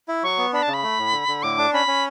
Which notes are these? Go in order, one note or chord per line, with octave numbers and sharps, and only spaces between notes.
E4
F#3 C#6
B3
D4 B5
C#3 A5
B5
A3
A2
D3
D3
A2 D6
D4
C#4 B5
C#4